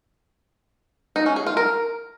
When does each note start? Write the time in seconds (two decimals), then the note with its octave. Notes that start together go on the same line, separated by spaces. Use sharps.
1.16 D#4
1.26 C#4
1.36 G#4
1.46 F4
1.57 A#4